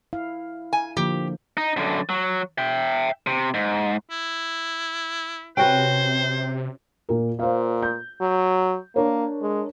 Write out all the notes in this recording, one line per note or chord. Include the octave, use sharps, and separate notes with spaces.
E4 F5
G#5
D3 F3 A#3 G4
D#4
F#2 D3
F#3
E5 G5
C3
G#2
E4
C3 C#4 F#4 B4 C5 G5
A#2 A#4
A#2 C5 F5
G6
F#3
A#3 D4 A#4 C#5
G#3